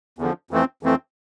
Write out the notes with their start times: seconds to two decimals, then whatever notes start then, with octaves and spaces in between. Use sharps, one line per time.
0.19 E2 D3 F3
0.51 F2 E3 A3 C4
0.83 F2 E3 A3 C4